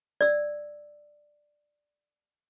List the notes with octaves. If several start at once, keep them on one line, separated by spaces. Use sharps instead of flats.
D5 E6